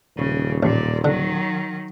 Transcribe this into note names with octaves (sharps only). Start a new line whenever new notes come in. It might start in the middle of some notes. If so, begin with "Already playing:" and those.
D#1 C#3
A1 A#2 D5
D3 D#3 F#3